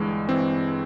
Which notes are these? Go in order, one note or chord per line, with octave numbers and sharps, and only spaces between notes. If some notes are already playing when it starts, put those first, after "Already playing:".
Already playing: G1 G2 E3 G#3
E3 C4